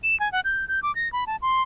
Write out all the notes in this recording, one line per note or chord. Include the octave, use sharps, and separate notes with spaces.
E7
G#5
F#5
G6
G6
D6
A#6
B5
A5
C6